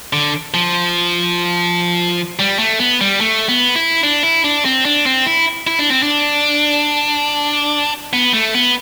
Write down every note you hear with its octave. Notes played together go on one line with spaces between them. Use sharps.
D3
F3
G3
A3
B3
G3
A3
B3
E4
D4
E4
D4
C4
D4
C4
E4
E4
D4
C4
D4
B3
A3
B3